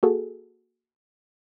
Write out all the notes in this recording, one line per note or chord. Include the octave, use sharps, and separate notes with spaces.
A#3 F#4 G#4 A4